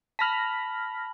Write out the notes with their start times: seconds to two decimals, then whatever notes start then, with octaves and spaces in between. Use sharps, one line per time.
0.19 A5 B5 F6 A#6 B6 F#7